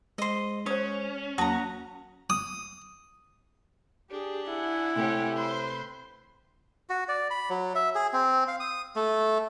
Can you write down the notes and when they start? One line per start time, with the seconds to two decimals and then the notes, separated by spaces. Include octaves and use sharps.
0.18 G#3 C5 D#5
0.66 C#4 C5 C#5 D#6
1.38 E2 F#3 A#3 F#4 A5 A#5 D#6
2.30 D#6
4.11 D4 G4 G#4
4.49 E4 F#5 G#5
4.95 C3 A3 G4 C#5
5.36 B4 C5 C6
6.89 F#4
7.08 D5
7.31 B5
7.50 F#3
7.75 E5
7.95 G#4
8.13 C4
8.48 F5
8.60 D#6
8.96 A3